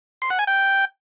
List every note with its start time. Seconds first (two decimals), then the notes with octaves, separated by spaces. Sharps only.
0.22 C6
0.30 F#5
0.39 G#5
0.47 G5